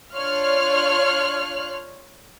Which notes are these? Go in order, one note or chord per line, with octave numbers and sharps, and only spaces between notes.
D4 F4 C#5 F6 F#6